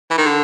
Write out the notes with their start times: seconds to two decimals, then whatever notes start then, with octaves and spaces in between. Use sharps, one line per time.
0.11 E3
0.18 D#3
0.26 D3